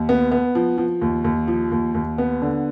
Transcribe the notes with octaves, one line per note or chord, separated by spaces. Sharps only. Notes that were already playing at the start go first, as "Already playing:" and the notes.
Already playing: D#2
B3
B3
F3
F3
D#2
D#2
F3
D#2
D#2
B3
D3